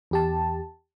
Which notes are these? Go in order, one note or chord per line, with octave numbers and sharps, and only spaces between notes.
E2 G4 A5